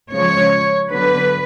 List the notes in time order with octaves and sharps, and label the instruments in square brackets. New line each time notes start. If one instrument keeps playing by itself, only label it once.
[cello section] C#3 F3 G#3 C#5
D3 F#3 B3 B4